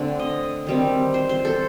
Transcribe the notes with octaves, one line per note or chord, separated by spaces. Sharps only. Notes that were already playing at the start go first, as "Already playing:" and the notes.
Already playing: D3 A3 C4 F#5
D#5
D#3 G3 C4
C5
C5
A4